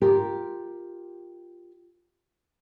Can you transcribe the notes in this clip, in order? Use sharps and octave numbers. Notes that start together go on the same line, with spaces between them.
F4 G4 A#4